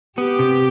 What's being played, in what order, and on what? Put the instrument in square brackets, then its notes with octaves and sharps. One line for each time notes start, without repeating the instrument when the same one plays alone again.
[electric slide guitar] B3 [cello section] G4
[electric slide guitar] C3